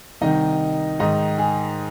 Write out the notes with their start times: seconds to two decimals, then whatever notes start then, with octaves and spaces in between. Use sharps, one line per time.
0.21 C2 C3 D#3 D#4 D#5
0.99 G#2 D#3 D#4 D#5
1.38 G#4